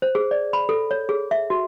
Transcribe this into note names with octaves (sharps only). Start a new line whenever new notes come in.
C5
G#4
D5
B5
A4
C#5
G#4
E5
F#4